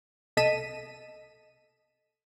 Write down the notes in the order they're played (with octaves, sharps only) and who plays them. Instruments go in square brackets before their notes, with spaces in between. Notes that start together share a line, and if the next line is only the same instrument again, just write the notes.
[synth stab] C2 A4 D#5 B6 D#7 E7